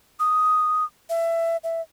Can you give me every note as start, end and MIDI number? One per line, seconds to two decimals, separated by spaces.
0.19 0.84 87
1.09 1.57 76
1.63 1.81 76